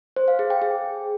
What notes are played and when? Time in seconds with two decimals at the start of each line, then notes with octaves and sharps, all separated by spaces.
0.16 C5
0.28 F5
0.39 G#4
0.50 G5
0.62 G#4